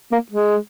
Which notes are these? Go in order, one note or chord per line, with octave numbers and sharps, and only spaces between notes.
A#3
G#3